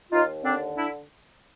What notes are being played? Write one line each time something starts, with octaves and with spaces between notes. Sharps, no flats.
D#2 D#4 F4
D3 C4 D4
D4 E4